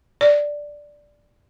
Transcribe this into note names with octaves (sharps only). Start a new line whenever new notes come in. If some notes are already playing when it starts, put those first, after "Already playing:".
D5